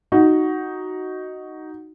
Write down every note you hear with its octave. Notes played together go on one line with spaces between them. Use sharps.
D#4 F#4